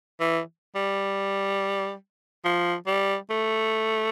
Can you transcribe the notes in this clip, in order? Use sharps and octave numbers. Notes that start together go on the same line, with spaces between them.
E3
G3
F3
G3
A3